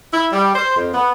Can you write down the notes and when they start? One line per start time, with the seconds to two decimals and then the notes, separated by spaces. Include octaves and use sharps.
0.12 E4
0.32 G3
0.55 C5
0.76 F2
0.93 B3